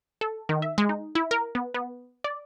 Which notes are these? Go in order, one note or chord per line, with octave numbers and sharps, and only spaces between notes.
A4
D#3
E5
G#3
D#4
E4
A#4
B3
B3
D5